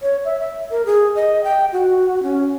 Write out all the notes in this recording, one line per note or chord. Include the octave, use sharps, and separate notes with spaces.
C#5
E5
E5
A#4
G#4
D#5
G5
F#4
C#4